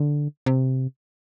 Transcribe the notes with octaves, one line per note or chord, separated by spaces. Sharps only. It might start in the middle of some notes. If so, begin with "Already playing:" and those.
Already playing: D3
C3